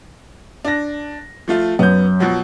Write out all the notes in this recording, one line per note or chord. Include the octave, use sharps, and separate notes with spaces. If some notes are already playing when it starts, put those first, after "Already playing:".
D4 A#6
F3 A3 F4
F#2 B3 G6
B2 F3 F#3